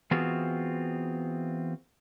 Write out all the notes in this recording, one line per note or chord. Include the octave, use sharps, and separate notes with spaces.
E3 B3 C4 F4 F#4 G#4